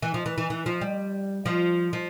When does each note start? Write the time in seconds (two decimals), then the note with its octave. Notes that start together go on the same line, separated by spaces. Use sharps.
0.02 E3
0.14 F3
0.26 E3
0.38 E3
0.50 E3
0.66 F3
0.81 G3
1.46 F3
1.93 F3